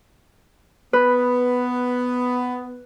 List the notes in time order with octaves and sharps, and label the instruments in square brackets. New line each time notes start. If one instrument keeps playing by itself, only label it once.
[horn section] B3 [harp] B4